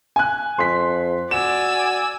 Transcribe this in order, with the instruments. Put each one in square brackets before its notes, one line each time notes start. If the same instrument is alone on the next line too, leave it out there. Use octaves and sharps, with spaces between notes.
[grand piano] G#5 F#6
[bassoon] F2 [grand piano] C6 B6
[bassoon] F#4 [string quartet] D5 G#5 E6 [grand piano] E7